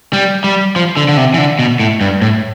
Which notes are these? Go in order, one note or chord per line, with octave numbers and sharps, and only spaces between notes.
G3
G3
F3
D3
D3
C3
E3
D3
B2
A2
G2
A2